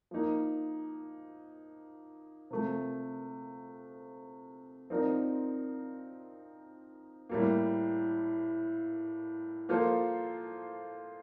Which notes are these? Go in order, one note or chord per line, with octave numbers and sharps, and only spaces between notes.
F3 A#3 D#4
C3 F3 A3
F3 C4 D#4 A#4 D5
A2 G3 A#3
F3 A#3 F4 A4 C5